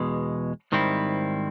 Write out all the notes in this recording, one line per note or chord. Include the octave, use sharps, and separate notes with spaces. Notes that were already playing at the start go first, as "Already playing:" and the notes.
Already playing: E2 B2 G#3
G#2 D#3 G3 C4 E4